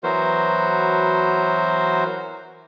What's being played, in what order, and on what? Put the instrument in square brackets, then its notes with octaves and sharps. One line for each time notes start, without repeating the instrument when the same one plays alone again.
[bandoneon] E3 F#3 B3 F#4 A#4 C5